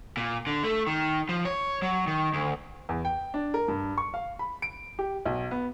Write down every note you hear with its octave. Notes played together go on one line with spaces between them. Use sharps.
A#2
D3
A3
D#3
F3
C#5
F#3
D#3
D2
E2
G5
D4
A#4
G2
C#6
F5
B5
D7
G4
B1
B3